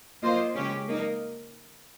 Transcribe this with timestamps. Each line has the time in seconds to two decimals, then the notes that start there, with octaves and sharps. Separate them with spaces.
0.22 A#3 F4 C5 D#5
0.55 C#3 G#3 C#4 G4
0.88 A#3 D#4 A#4